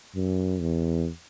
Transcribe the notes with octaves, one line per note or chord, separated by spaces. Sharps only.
F#2
E2